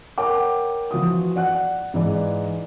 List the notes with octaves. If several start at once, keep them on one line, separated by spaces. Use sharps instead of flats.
A#4 C#5 F#5 G5 A#5 D6
E3 F3 F#4 D#6
D5 F#5 F#6
G#2 E3 D5